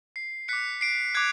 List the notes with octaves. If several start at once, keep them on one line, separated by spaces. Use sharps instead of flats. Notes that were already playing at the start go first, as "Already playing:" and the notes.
C7
D6 F#6 B6 C#7
C7 D7
D6 F#6 G#6